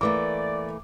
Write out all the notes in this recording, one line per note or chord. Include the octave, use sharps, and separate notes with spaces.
E3 A3 A#3 B4 D5 D6